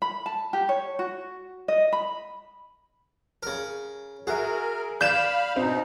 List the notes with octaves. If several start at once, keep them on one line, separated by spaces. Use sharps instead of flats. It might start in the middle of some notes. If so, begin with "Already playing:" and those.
B5
A5
G4
C#5
F#4
D#5
B5
C#3 A#4
F#4 G#4 A#4 E5
D5 F5 B5 G6 E7
B2 C4 D#4